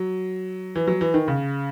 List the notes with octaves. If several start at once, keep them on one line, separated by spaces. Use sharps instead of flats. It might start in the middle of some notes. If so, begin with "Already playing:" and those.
Already playing: F#3
E3
F#3
E3
D#3
C#3